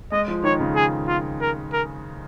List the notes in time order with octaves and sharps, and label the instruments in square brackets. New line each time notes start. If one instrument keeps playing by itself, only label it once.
[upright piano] G#3 [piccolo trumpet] D#5
[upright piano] F3
[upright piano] D#3 [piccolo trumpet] C#5
[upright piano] C#3
[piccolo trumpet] G#4
F4
A#4
A#4